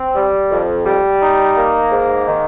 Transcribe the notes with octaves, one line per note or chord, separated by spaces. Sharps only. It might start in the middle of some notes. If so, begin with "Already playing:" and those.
Already playing: C4
G3
F2
G3
D#4
A#3
G#2
D#3